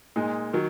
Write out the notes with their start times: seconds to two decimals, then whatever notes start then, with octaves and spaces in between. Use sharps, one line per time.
0.16 A#2 G#3 D#4
0.53 D#3 F#3